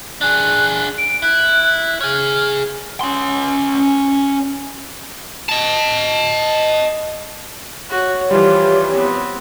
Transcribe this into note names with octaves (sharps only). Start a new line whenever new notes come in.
D4 G#4 F#6
D7
E4 F#6
G#4 C#5 F6
C#4 C6
D#5 A5
F#4 C#5
E3 F3 G3 F4 G4
B3 C4